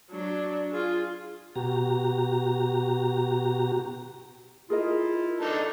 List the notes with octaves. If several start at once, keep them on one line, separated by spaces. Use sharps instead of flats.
F#3 D4
F4 G#4
B2 F#4 G4 A#5
E4 F4 G#4 A#4 D#5
D4 D#4 A4 B4